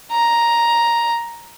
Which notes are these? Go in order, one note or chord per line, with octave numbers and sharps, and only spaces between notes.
A#5